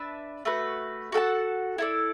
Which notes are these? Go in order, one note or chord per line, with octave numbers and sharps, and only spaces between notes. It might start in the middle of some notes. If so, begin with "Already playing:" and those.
Already playing: D4 B4 E5 A5
A3 F#4 B4
F#4 A4 F#5 A5
E4 A4 D5